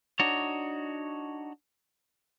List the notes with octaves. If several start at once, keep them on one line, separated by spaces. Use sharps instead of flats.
D4 D#4 F#4 C#5